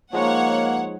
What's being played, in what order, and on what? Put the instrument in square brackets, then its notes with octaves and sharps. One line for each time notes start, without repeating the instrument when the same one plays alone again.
[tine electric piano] F3 G#3 D#4 [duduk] A#3 [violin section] C#5 F#5